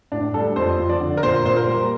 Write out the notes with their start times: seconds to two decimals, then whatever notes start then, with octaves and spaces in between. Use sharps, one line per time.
0.12 A2 D4
0.34 G3 A4
0.56 F2 C5
0.79 F3
0.89 D5
1.00 D3
1.17 A#4
1.23 A#2 C5
1.45 A#2 C5
1.56 A#4
1.68 G3